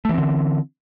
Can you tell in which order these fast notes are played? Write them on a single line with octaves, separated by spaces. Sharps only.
A3 E3 C4 D3